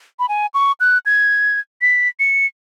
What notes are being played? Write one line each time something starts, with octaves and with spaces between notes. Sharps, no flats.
B5
G#5
C#6
F#6
G#6
B6
C#7